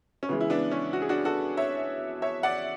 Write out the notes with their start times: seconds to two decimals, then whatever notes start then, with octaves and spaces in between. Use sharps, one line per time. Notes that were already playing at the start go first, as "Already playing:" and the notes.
0.23 C#4
0.29 C#3 E3 G#3 B3
0.41 E4
0.50 B3 D4
0.72 C#4
0.93 F#4
1.02 G#4
1.09 D4 F#4
1.25 F#4 A4
1.57 C#5 E5
2.22 C#5 E5
2.43 D5 F#5